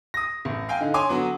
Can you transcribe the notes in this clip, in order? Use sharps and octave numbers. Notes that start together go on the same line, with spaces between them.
D#6 A#6
A1
F5 G5 G#5
D3 D#4
C#5 G#5 C6 D6
D3 F#3 B3